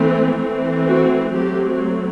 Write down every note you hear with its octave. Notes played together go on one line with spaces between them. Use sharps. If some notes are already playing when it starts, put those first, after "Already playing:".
Already playing: E3 A3 C4
E3 A3 C4
F#4
F#3 A3 C4 G4